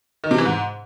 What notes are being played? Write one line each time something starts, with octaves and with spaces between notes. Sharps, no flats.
D#3
C3
E3
G#2